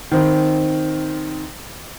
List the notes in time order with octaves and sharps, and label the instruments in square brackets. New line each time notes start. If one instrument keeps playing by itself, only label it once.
[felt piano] D#3 C4